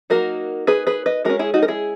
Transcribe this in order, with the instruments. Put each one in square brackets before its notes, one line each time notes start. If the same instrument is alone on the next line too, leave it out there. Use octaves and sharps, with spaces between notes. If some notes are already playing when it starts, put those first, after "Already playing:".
[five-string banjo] F#3 A#3 D#4 F#4 A#4
G#4 B4
G#4 B4
B4 D#5
G#3 C#4 F#4 A#4
E4 G#4
D#4 F#4
A#4
E4 G#4